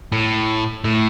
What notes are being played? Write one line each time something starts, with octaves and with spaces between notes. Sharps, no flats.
A2
A2